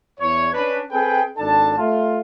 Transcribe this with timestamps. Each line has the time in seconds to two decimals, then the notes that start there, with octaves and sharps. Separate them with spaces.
0.19 E2 C#5
0.53 C#4 D4 B4
0.91 C4 G#4 A4 B4 G5
1.37 G#1 D4 A4 A5
1.77 A3 F4